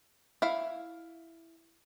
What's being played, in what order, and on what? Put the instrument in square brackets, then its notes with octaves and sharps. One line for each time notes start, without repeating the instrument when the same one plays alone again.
[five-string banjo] E4 F5